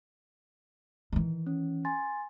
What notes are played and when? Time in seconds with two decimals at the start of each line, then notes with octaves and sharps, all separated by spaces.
1.13 D#3 E3
1.47 C#4
1.85 G#5 C6 A6